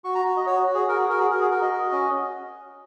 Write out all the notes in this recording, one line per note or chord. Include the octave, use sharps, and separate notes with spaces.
F#4 C#6
A#5
F#4
D#5
F#4 C#5
F#4
G#4
F#4 A#4
G#4
F#4 A#4
G#4
F#4 A#4
G#4
F#4 A#4
D#5
F#4
C#4